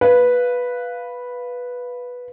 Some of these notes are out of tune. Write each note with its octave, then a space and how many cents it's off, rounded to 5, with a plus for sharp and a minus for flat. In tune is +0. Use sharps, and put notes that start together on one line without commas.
B4 -5 F5 +0